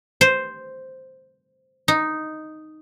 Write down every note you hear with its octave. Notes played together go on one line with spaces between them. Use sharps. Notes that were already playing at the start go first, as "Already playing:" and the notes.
C5
D#4